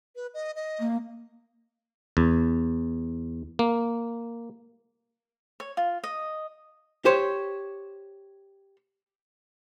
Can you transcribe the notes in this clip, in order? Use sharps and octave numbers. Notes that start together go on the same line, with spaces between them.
B4
D#5
D#5
A#3
E2
A#3
C#5
F4
D#5
G4 C5 C#5